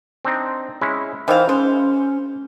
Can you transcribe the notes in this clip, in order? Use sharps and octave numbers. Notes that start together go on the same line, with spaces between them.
C4 D4 D#4
G#3 C#4 E4
D#3 E3 C5 F5
G#3 C#4 C5